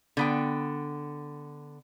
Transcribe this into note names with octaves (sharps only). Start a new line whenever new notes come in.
D3 B3 G5